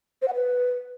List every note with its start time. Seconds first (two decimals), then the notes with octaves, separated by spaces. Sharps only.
0.22 C5
0.28 F#5
0.34 B4